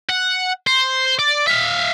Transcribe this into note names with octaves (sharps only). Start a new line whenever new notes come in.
F#5
C5
D5
E5 F5